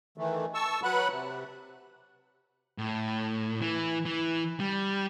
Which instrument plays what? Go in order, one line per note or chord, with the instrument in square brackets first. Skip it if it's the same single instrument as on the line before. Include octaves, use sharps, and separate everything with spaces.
[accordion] D#3 E3 A3
A5 C#6 E6
F#3 B4 F#5 B5 F#6
C3
[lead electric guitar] A2
E3
E3
G3